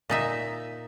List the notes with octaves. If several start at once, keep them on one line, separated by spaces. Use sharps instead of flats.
A#2 D#4 E5